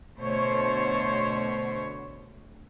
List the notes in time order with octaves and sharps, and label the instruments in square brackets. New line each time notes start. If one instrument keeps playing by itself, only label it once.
[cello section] B2 D3 A3 C5 C#5